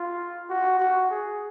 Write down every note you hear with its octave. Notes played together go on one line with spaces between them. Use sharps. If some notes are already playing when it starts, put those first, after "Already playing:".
Already playing: F4
F#4
F#4
G#4